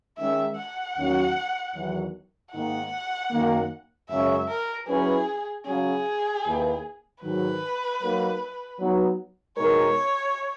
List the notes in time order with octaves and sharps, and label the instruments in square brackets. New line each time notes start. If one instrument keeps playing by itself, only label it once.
[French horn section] D#3 G#3 C#4 [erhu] E5
[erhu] F#5
[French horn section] D#2 D#3 F#3 C#4 F#4
E2 D#3 F#3
[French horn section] G#2 D#3 A#3 D#4 [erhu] F#5
[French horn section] F#2 D#3 A#3
[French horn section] F#2 C#3 G#3 C#4 [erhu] E5
[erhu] A#4
[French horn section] F#3 C#4 E4 B4 [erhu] G#4
[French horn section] C#3 F#3 C#4 [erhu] G#4
[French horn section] D#2 D#3 A#3 E4 B4
[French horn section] G#2 D#3 F#3 [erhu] B4
[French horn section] F#3 A#3 D#4 A#4
F#3 B3 D#4
[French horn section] B2 G#3 D#4 A#4 [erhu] C#5